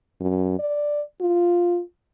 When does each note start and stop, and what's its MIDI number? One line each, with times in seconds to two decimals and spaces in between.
0.20 0.56 42
0.59 1.01 74
1.21 1.80 65